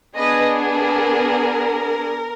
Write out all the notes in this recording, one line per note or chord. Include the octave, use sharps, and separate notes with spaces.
B3 D4 G#4 B4 D#5
A#4